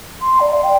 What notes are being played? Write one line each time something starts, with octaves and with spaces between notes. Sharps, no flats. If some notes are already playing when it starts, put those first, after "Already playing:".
C6
D5
F5
G5